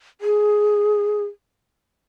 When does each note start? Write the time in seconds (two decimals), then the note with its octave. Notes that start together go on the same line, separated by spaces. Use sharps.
0.21 G#4